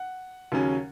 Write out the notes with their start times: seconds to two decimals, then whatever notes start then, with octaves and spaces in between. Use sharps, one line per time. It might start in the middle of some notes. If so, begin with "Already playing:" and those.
Already playing: F#5
0.52 D#2 C#3 F#3 C#4